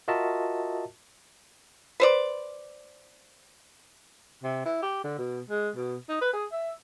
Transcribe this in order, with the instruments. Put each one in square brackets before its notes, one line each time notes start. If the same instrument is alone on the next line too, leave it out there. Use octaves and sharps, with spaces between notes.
[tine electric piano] F4 F#4 A#4 D#5 E5 A5
[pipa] B4 C5 D5
[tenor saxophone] C3
E4
G4
D3
B2
G#3
B2
D#4
B4
G#4
E5